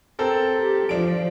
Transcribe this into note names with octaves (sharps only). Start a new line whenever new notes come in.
C4 A4 A#4
G4
F3 D4 D7